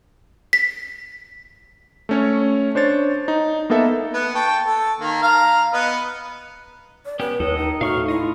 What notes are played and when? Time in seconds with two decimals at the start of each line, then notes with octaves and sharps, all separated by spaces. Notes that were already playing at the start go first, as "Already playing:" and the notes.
0.53 B6
2.09 A3 C#4 C#5
2.75 D4 C5 C#5 A6
3.28 D#4
3.70 A#3 B3 D#4 A4 E5
4.14 B3
4.35 G5 A5 C#6
4.67 A4 A5
5.01 D#3 A#3
5.22 F5 A#5 F6
5.73 B3 B4 D#5
7.05 D5
7.20 B3 C#4 G4 B4
7.40 D#2 A4 C#5 D#5
7.57 D#4 G5
7.81 A2 F#4 F5 C#6 F6
8.08 A3 E4 F4 D#5